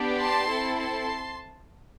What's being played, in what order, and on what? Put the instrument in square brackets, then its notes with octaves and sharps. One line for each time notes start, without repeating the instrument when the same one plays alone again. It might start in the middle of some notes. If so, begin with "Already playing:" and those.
Already playing: [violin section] B3 D4 G4
A5 C6
C4 E4 A4
A5 C6